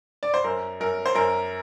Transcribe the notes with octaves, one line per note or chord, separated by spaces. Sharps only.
D5
C5
F#2 A#4
F#2 A#4
C5
F#2 A#4